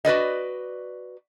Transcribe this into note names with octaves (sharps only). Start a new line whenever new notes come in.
F#4 B4 D5 D#5